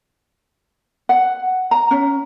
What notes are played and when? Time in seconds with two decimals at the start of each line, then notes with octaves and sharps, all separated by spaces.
1.09 F#5
1.71 A#5
1.91 C#4